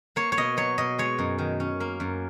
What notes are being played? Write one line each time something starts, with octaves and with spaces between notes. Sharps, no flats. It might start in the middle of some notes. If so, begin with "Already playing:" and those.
A#3 C#5
C#5
B2 D#5
F#3 C#5
B2 D#5
G#3 C#5
F#2
D#3
C#4
A#3
F#2